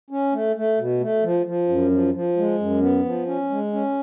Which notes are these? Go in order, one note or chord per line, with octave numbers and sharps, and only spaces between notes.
C#4
A3
A3
B2
A3
F3
F3
F#2
F3
F3
G#3
F#2
B3
F3
C#4
G#3
C#4